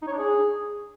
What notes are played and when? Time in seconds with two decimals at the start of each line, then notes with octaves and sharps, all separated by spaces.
0.02 D#4
0.07 C#5
0.13 D4
0.18 G#4